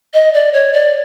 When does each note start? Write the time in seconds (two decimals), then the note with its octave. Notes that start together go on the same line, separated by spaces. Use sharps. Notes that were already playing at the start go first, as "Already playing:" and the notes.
0.13 D#5
0.33 D5
0.53 C#5
0.73 D5